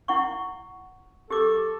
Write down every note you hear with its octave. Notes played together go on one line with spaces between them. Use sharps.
E4 F#5 C#6
G4 A4 D6